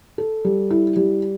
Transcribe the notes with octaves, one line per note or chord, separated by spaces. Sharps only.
A4
G3
E4
G3